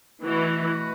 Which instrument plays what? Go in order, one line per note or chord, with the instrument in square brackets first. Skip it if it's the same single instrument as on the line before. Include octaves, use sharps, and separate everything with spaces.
[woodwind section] B2 A3 F#4 B4 [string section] E3